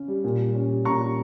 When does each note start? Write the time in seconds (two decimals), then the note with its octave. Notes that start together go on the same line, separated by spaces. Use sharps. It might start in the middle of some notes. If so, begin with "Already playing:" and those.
Already playing: C#3 C#4
0.08 G3
0.24 A#2
0.39 G3
0.55 C#4
0.70 G3
0.85 A#2 A#5 C#6
1.02 G3